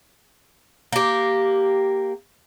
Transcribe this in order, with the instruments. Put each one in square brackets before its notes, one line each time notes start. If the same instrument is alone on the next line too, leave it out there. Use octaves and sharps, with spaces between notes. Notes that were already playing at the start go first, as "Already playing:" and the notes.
[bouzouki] A#3 G4